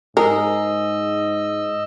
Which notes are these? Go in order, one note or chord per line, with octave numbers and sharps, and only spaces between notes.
G#2 G#4 A#4 D#5 E6